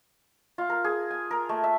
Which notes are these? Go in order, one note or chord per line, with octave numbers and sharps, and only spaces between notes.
F4
A#4
G#4
G#5
A#4
A3
E5